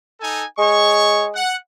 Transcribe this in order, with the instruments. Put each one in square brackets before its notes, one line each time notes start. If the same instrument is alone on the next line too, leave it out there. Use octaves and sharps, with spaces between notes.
[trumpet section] D#4 A4 G#5
[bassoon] G#3 [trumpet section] C#5 C#6
[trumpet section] F#5